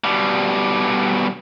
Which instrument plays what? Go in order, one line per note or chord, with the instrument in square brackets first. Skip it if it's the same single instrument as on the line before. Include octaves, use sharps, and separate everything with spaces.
[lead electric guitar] B2 G3